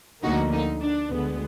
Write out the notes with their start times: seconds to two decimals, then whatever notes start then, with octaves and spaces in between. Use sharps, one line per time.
0.23 D2 D3 F3 A#3 D#4 F#4
0.53 D#4
0.81 D4
1.10 D2 D3 G#3 B3